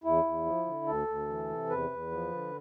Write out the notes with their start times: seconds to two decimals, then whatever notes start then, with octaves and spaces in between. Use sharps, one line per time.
0.04 E2 E4
0.25 E2
0.46 F3
0.66 D3
0.87 D2 A4
1.08 D2
1.28 E3
1.49 C3
1.70 E2 B4
1.91 E2
2.11 F3
2.32 D3